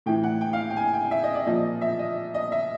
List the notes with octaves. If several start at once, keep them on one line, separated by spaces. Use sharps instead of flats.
A2 E3 G5
F#5
G5
F5
G5
G#5
G5
E5
D#5
D5
A#2 F3 D#5
E5
D#5
D#5
E5